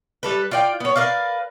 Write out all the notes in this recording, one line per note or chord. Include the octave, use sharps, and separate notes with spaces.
G3 A4 B4
F4 D5 G5
B3 C#5
A#4 B4 D5 F5